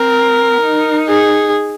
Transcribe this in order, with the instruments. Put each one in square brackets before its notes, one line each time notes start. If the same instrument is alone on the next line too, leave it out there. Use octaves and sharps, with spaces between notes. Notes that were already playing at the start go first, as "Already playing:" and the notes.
Already playing: [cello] C4 [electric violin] A#4
[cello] D#4
[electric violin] G#4